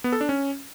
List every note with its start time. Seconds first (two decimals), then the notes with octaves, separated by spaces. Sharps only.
0.04 B3
0.12 A4
0.21 D4
0.29 C#4